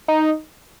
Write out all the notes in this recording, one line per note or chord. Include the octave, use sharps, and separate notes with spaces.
D#4